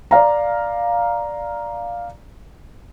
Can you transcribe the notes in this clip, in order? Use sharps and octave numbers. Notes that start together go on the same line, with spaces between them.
D5 F5 A#5